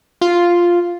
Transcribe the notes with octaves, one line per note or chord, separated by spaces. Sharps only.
F4